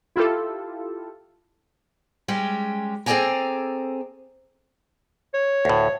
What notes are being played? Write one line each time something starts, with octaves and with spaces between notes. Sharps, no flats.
E4 F4 G4 A4
G3 G#3 C#4 G4
C4 G#4 A4 D5 G#5 A#5
C#5
D2 A2